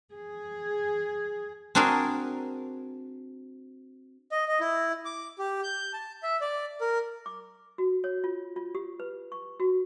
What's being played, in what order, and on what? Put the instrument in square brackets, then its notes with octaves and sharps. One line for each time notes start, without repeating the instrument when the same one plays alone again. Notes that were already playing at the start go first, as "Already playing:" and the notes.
[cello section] G#4
[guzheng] C4 D4 F#4 G#4 A#4
[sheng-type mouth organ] D#5
D#5
E4
D6
G4
G6
A5
E5
D5
A#4
[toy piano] D6
F#4
C#5
F4
F4
G4
B4
C#6
F#4